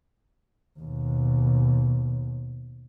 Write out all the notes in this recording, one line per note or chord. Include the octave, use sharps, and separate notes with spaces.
D#2 B2